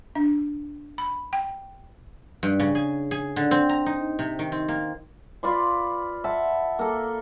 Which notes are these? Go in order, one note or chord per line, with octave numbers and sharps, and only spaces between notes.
D4
B5
G5
G2
C#3
G#4
G#4
D3
C4
A#5
D#4
C3
D#3
C4
A#3
F4 B4 D5 C6
E5 F#5 A5
A#3 A4